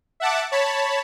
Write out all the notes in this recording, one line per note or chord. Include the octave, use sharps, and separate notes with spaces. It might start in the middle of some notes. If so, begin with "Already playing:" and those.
E5 F#5 A5 D6
C#5 A5 B5